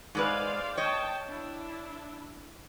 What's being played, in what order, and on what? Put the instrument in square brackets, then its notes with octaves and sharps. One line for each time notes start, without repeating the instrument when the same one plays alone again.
[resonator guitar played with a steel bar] G#2 G#3 B4 [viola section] C5 D5 F5
[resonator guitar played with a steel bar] C#5 D#5 [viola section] G5 A5
[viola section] D4 E4